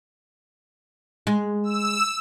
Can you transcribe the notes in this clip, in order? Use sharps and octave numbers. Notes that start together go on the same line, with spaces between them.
G#3
E6